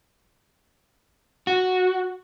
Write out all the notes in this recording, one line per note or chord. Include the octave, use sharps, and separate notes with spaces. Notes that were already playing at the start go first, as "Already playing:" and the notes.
F#4